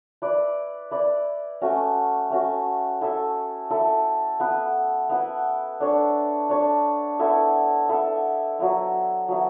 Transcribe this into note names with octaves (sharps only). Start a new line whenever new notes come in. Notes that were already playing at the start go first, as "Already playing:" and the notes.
E4 B4 D5
E4 B4 D5
A3 C#4 F#4
A3 C#4 F#4
E4 A4 E5
E4 A4 E5
B3 E4 B4
B3 E4 B4
D4 A4 C#5
D4 A4 C#5
B3 E4 A4 E5
B3 E4 A4 E5
F#3 B3 E4
F#3 B3 E4